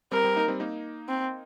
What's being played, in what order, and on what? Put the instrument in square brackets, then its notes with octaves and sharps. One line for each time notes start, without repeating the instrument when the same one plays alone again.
[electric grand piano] G3 C4 [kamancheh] A#4
[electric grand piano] G3 C4
A#3 D#4
G3 C4
A#3 D#4
[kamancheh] C4